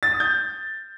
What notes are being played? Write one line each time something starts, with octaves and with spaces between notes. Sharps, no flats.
A6
D#6
G6